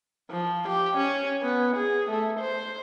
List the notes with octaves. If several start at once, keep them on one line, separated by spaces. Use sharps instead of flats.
F3
G4
C#4
B3
G#4
A3
C5